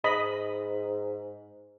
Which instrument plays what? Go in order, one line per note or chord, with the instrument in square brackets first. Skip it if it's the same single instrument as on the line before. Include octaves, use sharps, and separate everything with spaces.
[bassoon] G#2 [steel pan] D#5 B5